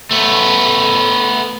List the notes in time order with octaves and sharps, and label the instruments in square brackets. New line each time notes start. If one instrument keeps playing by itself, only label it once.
[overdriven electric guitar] A3 B3